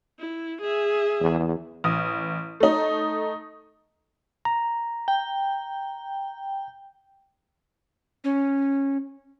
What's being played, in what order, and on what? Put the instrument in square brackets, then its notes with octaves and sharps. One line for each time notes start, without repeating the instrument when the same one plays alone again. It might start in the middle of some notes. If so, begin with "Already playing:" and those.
[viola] E4
G#4 E5
[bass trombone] E2
[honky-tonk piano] A1 D#6
A3 D#4
[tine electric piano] A#5
[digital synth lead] G5
[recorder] C#4